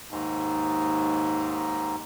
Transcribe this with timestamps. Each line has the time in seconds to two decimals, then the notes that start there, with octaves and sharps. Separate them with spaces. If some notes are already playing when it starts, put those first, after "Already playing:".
0.11 D#2 G#2